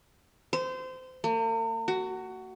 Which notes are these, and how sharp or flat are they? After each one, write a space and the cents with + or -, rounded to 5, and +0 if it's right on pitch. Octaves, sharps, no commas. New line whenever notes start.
C5 -25
A#3 -45
F#4 +15